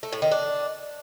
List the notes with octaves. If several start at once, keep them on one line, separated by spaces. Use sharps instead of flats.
A3
A2
D#3
D4